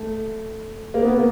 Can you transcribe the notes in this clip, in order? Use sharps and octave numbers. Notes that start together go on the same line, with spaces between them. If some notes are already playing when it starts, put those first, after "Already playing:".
Already playing: A3
A#3
B3
A#3